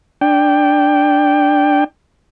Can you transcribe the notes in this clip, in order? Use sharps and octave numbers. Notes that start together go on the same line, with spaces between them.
D4 G5